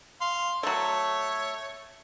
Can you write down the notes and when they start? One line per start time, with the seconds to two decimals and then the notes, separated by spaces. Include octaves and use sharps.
0.21 F5 C6
0.63 F#3 A3 C#5